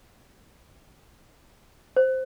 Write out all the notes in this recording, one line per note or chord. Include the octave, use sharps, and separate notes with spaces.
C5